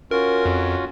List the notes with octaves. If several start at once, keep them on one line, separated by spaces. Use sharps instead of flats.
C#4 F4 F#4 A#4
F2